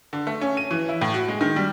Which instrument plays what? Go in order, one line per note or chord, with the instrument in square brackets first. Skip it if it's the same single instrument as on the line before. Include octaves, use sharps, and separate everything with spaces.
[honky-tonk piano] D3
A3
C#4
D#7
E3
E4
A2
F#4
G#3
D#3
G3